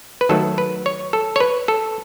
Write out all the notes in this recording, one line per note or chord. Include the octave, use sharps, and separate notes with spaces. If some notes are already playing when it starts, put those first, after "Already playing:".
B4
D#3 F#3 A3 A4
B4
C#5
A4
C#5
B4
A4